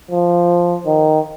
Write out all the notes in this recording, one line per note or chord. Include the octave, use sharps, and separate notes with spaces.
F3
D#3